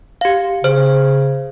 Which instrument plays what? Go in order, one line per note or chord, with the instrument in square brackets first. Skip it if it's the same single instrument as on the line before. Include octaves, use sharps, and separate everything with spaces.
[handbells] G4 F5
[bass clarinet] C#3 [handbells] C5